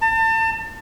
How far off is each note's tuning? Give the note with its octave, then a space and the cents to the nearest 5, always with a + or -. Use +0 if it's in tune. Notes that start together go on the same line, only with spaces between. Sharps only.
A5 +35